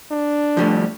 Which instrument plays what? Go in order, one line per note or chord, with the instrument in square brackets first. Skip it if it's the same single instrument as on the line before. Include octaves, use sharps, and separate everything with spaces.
[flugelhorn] D4
[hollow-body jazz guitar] F3 G3 A3